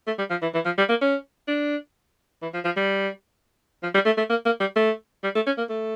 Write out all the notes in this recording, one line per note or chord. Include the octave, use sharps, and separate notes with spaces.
A3
G3
F3
E3
E3
F3
G3
A#3
C#4
D4
E3
F3
F3
G3
F3
G3
A3
A3
A#3
A#3
G3
A3
G3
A3
C#4
A#3
A3